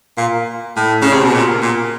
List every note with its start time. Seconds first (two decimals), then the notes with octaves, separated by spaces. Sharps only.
0.17 A#2
0.76 A2
1.02 C#3
1.13 C3
1.24 B2
1.34 A#2
1.62 A#2